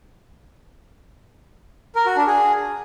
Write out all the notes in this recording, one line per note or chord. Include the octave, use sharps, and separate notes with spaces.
A#4
F#4
D4
G#4